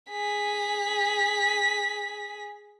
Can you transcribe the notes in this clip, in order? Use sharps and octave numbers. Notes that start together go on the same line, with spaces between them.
G#4 B6